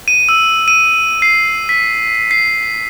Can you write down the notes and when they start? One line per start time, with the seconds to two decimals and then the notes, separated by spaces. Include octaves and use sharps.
0.08 D#7
0.29 E6
0.68 D#7
1.22 C7
1.69 B6
2.31 C7